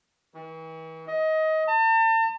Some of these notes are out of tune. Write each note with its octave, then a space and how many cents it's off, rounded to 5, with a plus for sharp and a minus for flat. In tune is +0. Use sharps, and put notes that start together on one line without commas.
E3 -40
D#5 +20
A5 +40